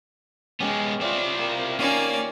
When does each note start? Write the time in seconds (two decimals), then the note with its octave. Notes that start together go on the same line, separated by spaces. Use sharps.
0.60 G#3 B3 C#4 G4 G5
1.01 C4 E4 F4 D5
1.38 A#3
1.79 D#3 A#3 C#4 D5 F5 G5